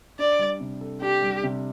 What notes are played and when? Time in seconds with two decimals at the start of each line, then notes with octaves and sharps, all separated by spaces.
0.19 D4 D5
0.39 G3
0.60 C3
0.81 A4
1.02 D4 G4
1.22 G3
1.43 C3